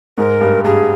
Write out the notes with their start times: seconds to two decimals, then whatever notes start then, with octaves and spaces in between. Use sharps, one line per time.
0.18 G#2 G#3 A#4
0.41 G2 G3
0.64 G2 G3 G#4